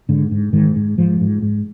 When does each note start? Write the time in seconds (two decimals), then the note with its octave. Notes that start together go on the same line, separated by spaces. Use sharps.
0.09 G#2 D3
0.31 G#2
0.53 G#2 D#3
0.76 G#2
0.98 G#2 F3
1.21 G#2
1.42 G#2